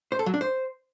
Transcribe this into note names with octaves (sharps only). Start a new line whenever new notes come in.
C5
A4
F#3
D4
C5